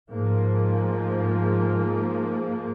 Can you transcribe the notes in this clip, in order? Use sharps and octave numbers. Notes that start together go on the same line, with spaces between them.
G#2 F3 A#3